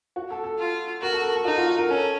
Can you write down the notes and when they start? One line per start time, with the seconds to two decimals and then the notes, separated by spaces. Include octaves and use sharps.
0.16 F#4
0.30 A4
0.44 A4
0.59 F4
1.02 F#4 A#4
1.13 A4
1.23 A#4
1.35 A4
1.45 D#4 F#4
1.56 F4
1.67 F#4
1.78 A#4
1.89 C#4 A4